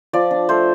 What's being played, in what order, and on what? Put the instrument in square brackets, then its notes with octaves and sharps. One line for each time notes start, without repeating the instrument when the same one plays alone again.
[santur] F3 D5
D4
A3 C5